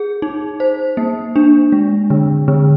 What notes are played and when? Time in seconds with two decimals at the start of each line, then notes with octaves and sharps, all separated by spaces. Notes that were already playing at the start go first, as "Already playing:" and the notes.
Already playing: G#4
0.22 D#4
0.60 C5
0.97 A#3
1.36 D4
1.72 G#3
2.10 D3
2.48 D3